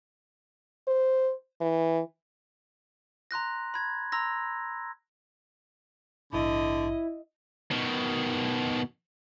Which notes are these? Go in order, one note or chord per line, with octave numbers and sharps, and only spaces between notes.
C5
E3
A#5 C6 F#6 A#6
B5 G#6
A#5 C6 E6 A#6
A#1 G#2 D3 E4 D#5
B2 D#3